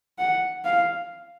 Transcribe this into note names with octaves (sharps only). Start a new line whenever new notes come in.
F#5
F5